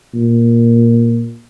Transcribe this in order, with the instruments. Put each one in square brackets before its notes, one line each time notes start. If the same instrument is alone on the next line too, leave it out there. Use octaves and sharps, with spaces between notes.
[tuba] A#2